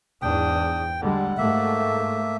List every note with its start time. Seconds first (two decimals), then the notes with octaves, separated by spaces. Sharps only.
0.22 E2 G#2 D4 G5 D#6
1.01 D3 G3 G#3 F#5
1.38 G#2 A3 A#3 E5